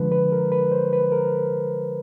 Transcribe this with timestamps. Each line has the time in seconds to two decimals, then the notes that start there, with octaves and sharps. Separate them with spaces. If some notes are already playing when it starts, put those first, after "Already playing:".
Already playing: D3 F3 G#3 B4
0.12 B4
0.32 A#4
0.52 B4
0.72 C5
0.93 B4
1.12 A#4